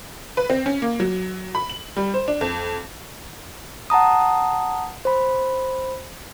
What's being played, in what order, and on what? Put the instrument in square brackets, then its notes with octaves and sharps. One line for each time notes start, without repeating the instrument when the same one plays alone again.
[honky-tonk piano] B4
C4
C#4
A#3
F#3
B5
F#7
G3
C5
D4
F2
[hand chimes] F#5 A5 A#5 D#6
C5 B5